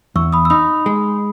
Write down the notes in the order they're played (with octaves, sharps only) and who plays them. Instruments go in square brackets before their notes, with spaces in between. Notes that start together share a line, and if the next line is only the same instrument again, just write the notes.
[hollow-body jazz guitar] E2 [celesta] C#6 E6
[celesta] B5 D#6
E6
[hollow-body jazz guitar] D#4 [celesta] B5 D#6
[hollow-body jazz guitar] G#3